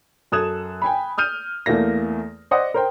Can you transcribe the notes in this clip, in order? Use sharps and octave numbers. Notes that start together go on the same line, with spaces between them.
F#2 A4 D#6 F#6 G#6 E7
G5 G#5 B5
D#6 F6 G6 D#7
E2 A3 A#3 A#6
C5 D5 D#5 F#5 D#6
A#4 C5 G5